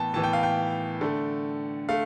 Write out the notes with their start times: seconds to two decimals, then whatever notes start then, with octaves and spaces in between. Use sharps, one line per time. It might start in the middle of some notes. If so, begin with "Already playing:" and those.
Already playing: A2 E3 B3 G5 A5
0.14 A2 E3 B3 A5
0.24 G5
0.33 F5
0.43 G5
1.01 D3 A3
1.89 A3 F5